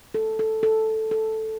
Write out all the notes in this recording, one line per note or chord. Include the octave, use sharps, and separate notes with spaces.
A4
A4
A4
A4